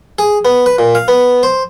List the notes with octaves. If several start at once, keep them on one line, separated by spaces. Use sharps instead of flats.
G#4
B3
B4
A#2
F5
B3
C5